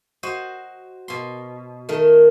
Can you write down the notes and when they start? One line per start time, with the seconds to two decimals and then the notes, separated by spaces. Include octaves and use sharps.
0.23 F#4 C5 D#5
1.08 B2 C6
1.89 D#3 A3 A#4